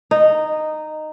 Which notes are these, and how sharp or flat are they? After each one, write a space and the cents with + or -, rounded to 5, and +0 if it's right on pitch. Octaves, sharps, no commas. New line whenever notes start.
D#4 -10